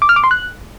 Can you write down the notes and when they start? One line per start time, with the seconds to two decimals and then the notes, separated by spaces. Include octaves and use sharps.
0.02 D6
0.09 F6
0.16 D6
0.24 C6
0.31 F#6